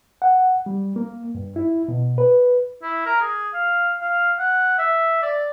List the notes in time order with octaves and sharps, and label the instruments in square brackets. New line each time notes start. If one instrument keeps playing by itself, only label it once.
[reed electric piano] F#5
G3
A#3
G2
E4
B2
B4
[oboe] E4
A#4
G#4
F5
F5
F#5
E5
D5